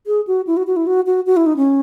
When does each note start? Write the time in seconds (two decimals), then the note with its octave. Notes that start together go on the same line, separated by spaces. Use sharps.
0.07 G#4
0.27 F#4
0.47 E4
0.57 F#4
0.67 F#4
0.76 E4
0.87 F#4
1.07 F#4
1.27 F#4
1.37 E4
1.46 D#4
1.57 C#4